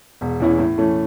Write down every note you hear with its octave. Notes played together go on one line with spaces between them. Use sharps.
E1
E2 E3 C#4 E4
A2
E3 A3 C#4